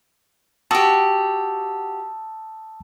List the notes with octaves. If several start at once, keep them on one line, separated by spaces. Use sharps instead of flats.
F#4 G4 A5 D#6 E6